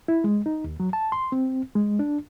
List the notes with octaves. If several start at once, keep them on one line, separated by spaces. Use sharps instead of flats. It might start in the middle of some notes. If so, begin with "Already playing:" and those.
E4
G#3
D#4
D#2
F#3
A5
C6
C4
G#3
D4